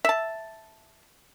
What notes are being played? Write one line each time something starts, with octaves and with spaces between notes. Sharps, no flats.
E5 A5